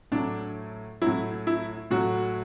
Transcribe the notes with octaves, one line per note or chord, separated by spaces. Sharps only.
A2 F#3 D4
A2 F#3 E4
E4
A2 F#3 F#4